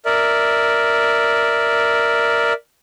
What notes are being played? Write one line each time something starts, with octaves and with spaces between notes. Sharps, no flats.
A#4 D5 E5